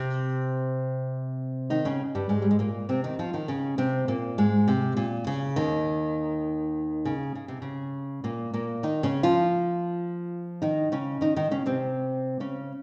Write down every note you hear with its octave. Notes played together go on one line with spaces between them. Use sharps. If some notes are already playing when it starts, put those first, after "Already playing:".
Already playing: C3 C4
D#3 D#4
C#3 C#4
G2 G3
G#2 G#3
G3
G#3
A#2 A#3
C3 C4
D#3 D#4
F3 F4
D#3 D#4
C#3 C#4
C3 C4
A#2 A#3
G#2 G#3
C3
A#2
C#3
D#2 D#3
C#3
C#3
C3
C#3
A#2 A#3
A#2 A#3
D#3 D#4
C#3 C#4
F3 F4
D#3 D#4
C#3 C#4
D#3 D#4
D#3 D#4
C#3 C#4
C3 C4
C#3 C#4